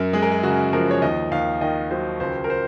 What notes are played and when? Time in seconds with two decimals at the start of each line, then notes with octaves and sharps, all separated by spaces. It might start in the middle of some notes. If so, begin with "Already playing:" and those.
Already playing: F#2 A#4
0.13 G#3 G#4
0.22 A#4
0.32 G#4
0.43 C#3 F#4
0.73 F3 A#4
0.91 C#5
1.02 D#2 D#5
1.31 D#2 F5
1.61 D#3 D#5
1.91 F#3 C5
2.20 C#2 C5
2.44 A#4
2.50 C5